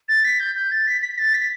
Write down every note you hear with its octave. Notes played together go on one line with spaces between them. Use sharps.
A6
B6
G6
G6
A6
B6
B6
A6
B6